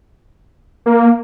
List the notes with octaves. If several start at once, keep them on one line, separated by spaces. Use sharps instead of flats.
A#3